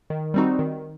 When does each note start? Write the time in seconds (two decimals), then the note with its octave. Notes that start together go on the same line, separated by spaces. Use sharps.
0.10 D#3
0.34 G3 C4 D#4 F#4
0.59 D#3